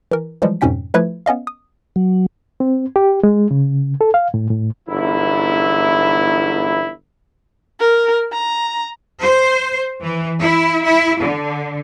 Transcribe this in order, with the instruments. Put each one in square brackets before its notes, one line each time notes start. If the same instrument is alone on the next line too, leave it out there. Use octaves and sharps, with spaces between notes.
[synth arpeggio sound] E3 A#4
E3 F3 G3 G#3
F2 G#2 B2 C#4 G5 B6
F3 A3 E4 B4 E5 G#6
B3 C#4 D#5 F5
D#6
[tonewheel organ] F#3
[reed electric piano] C4
G4
G#3
C#3
A4
F5
A2
A2
[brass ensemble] G1 E2 G#2 E4
[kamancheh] A#4
A#5
[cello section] C5
E3
E4
E4
D3